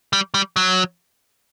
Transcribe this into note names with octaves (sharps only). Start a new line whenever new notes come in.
G3
G3
F#3